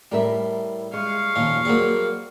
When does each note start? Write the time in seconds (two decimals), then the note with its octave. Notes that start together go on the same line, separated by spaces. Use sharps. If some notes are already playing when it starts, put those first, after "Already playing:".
0.12 A2 G3 A#4 E5
0.93 G#3 F5 C#6
1.36 D#2 A#2 F3 C#4
1.65 F#3 G3 A#3 C4 G#4